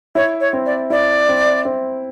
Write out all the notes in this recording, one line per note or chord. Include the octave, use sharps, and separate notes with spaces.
E4 C#5
C#5
C4
D5
E4 D5
C4
C4